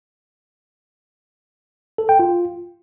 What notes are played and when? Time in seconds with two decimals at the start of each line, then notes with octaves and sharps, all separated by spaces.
1.98 A4
2.09 G5
2.19 F4